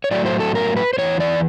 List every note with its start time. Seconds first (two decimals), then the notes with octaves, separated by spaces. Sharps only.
0.04 C#5
0.11 A2 F#3 A3 D5
0.26 C5
0.40 A4
0.55 A#4
0.76 B4
0.93 C5
0.98 E2 C#3 E3 C#5
1.20 D5